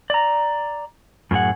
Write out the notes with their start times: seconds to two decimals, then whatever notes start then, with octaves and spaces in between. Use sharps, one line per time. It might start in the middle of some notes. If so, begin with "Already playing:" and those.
0.10 D5 A#5
1.31 F#2 A2 G#4 F#5